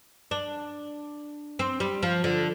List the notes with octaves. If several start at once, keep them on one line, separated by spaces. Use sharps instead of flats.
D4
C4
G3
F3
D3